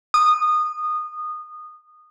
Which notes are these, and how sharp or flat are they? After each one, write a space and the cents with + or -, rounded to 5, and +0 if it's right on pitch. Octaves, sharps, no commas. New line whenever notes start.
D#6 -20